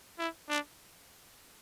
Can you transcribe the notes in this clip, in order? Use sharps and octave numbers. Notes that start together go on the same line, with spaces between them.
E4
D4